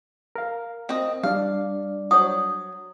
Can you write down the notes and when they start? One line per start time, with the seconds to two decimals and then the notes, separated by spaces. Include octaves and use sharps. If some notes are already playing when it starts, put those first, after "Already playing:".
0.36 A#4 F5
0.89 C4 D#5
1.23 G3 D4 D5 F5
2.11 F#3 C#5 D#6